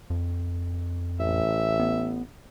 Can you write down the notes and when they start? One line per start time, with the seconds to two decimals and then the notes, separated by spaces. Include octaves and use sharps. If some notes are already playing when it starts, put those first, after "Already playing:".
0.10 F2
1.20 A1 E5
1.80 B3